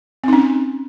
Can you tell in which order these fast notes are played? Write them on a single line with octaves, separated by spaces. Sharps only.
C4 D#4 C#4